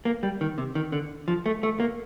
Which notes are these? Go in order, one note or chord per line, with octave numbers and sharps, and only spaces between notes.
A#3
G3
D#3
C3
D#3
D3
F3
A3
A3
A#3